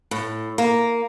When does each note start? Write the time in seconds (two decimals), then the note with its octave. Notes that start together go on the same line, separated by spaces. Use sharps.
0.11 A2
0.58 A#3